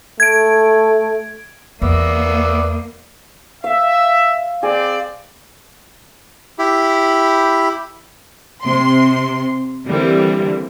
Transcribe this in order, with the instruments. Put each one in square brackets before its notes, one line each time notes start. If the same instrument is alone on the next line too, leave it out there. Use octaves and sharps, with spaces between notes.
[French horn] A3 [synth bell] G#6 D7
[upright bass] E2 [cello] A#3 [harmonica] B3 D5 E5
[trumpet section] E5 [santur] F5
[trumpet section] C4 D5 [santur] G#4
[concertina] E4 G4 B5
[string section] C3 C6
D3 E3 G3 A#3 C4